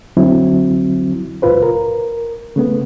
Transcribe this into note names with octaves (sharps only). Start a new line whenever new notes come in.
C2 F2 D3 F#3 C4 E4
C#2 F#2 A#2 F4 B4 C5
A#4
C#3 A3 B3